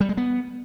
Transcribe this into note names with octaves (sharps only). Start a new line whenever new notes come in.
G3
G#3
B3